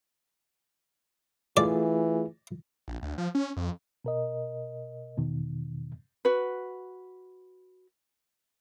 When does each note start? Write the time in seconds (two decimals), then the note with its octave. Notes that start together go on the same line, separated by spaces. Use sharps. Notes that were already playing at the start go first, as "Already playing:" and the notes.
1.57 E3 A3 F4 G#4 D5
2.88 A#1
3.02 D2
3.18 F3
3.35 C#4
3.57 F2
4.04 B2 A#4 D#5
5.17 E2 B2 D#3
6.25 F#4 B4